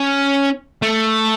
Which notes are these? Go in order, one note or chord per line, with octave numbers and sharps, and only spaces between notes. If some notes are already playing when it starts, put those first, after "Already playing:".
Already playing: C#4
A3